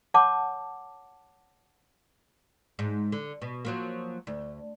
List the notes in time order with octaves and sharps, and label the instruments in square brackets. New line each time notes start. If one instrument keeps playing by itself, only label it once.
[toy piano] C#5 F#5 A5 D6
[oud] G#2
D3
B2
F3 F#3 A#3
D2